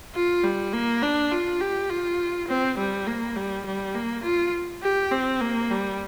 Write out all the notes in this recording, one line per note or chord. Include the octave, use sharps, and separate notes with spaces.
F4
G3
A#3
D4
F4
G4
F4
C4
G3
A#3
G3
G3
A#3
F4
G4
C4
A#3
G3